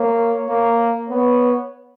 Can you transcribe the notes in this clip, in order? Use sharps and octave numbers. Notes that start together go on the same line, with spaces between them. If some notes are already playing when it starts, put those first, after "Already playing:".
Already playing: A#3 C#5
A#3
B3 C#5